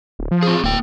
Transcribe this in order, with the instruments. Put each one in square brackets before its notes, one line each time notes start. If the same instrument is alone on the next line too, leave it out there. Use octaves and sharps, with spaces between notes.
[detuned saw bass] D1
F3
[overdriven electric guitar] C4 G#4
[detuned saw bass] D1 [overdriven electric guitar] A#3 G5